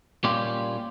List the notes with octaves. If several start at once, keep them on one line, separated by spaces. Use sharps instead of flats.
A#2 G3 C#4 F4 G4